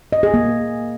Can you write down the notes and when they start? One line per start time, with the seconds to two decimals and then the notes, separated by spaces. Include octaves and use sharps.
0.13 D#5
0.23 G#4
0.34 A#3